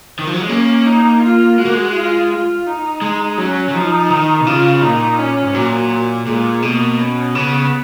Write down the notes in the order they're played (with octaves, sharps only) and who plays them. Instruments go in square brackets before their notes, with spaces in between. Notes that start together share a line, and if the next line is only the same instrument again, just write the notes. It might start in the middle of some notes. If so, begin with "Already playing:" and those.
[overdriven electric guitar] D#3
F3
F#3
G#3
[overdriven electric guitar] A#3 [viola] C#4
[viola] D#4
F4
[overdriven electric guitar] G#3 [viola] F#4
[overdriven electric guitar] A#3
G#3
[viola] F4
F4
D#4
[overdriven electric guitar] G#3
[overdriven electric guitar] F#3 [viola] C#4
[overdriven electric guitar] F#3
[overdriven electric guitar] F3 [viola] D#4
[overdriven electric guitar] D#3
B2
[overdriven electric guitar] C#3 [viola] F4
[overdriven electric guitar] A#2 [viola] D#4
[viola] C#4
[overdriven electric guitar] G#2
[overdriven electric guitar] A#2 [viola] F#3
[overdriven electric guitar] A#2 [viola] G#3
[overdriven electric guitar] B2 [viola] A#3
[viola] C#4
[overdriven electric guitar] C#3 [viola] B3